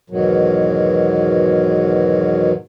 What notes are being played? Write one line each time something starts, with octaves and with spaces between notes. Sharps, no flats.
E2 G#2 B2 D#3 F#3